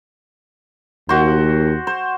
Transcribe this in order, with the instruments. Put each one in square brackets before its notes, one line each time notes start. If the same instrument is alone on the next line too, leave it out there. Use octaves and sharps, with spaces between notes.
[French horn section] D#2 [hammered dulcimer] F#4 C5
[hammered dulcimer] C5